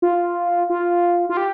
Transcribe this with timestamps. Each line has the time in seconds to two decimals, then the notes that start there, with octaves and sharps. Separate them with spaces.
0.02 F4
0.70 F4
1.29 F4
1.37 G4